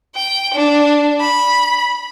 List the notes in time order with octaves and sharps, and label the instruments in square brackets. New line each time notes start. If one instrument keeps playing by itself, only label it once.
[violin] G5
D4
B5